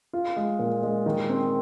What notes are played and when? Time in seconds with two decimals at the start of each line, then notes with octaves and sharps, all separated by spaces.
0.13 F4
0.36 G#3
0.59 A#2
0.83 G#3
1.06 D#3
1.29 C4